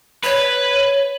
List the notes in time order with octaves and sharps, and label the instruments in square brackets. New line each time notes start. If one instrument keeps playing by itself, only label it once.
[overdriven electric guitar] B4 [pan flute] C#5